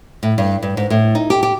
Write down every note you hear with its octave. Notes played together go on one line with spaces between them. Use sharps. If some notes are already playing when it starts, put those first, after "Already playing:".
A2
G2
G2
G#2
A2
D#4
G4
G4